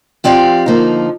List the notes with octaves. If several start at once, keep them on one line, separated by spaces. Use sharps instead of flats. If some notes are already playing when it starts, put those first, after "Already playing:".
F3 C4 G4 D5 F5
D3 F3 A#3 D#4